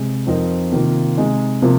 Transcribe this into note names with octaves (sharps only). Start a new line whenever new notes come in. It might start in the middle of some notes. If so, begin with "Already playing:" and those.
Already playing: C3 G#3
F2 F3 C4 D#4 A#4
C3 D#3 A#3 F4
C3 G#3 D#4
C3 F3 A#3 F4